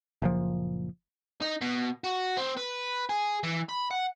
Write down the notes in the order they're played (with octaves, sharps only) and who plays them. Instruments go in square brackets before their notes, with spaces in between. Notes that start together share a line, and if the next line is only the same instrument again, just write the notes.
[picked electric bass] F#1 A#2 F3
[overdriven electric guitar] D#4
B2
F#4
C4
B4
G#4
E3
B5
F#5